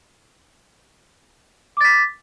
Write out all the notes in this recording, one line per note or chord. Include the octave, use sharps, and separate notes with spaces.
D6 A6 B6